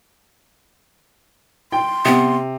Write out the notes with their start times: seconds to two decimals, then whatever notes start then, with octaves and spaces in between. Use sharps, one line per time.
1.72 G5 C6
2.05 C3 B3